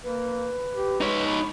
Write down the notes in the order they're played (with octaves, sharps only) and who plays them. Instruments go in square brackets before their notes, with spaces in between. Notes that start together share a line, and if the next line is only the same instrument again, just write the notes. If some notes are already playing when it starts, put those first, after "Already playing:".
[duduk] A#3 [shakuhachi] B4
[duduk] G4
[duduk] G#3 [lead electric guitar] D#4 C#5
[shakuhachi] B5